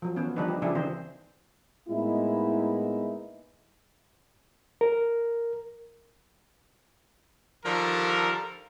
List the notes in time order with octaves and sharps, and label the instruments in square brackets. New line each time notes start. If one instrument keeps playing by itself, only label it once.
[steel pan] F3 F#3
E3 B3 C#4
D3 F3 G3 D4 D#4 B4
G4
C#3 F3 D4 E4 G4 G#4
D#3 E3 C4 C5
[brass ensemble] A2 G#3 A#3 B3 D#4 E4
[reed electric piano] A#4
[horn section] D3 D#3 F3 G3 A4 A#4